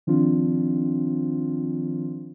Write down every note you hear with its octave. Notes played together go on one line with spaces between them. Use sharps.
D#3 F3 C4 D4 F4